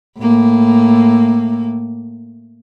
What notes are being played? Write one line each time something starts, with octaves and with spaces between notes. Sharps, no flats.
A2 A#3